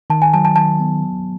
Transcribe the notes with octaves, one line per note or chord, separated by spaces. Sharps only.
D#3 A5
G#5
F#3 A5
A5
D#3 A5
B3
F#3